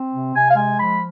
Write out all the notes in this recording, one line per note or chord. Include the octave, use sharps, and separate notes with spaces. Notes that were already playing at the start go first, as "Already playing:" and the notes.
Already playing: C4
C3
C3 G#5
F5
G#3 G#5
F3 B5